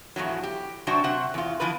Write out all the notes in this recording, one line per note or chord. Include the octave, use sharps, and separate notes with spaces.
E2 A2 F3 F#3
G4
C3 F#3 C4 D4 F#4
C3 C4 F#5
E2 F4
E3 F3 B3 B4